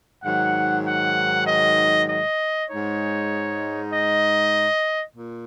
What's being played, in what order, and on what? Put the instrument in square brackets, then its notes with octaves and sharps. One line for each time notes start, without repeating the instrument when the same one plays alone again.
[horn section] G#2 D#3 F#3 F#5
F#5
D#5
D#5
G#2 G#3 D#4 C#5
D#5
A#2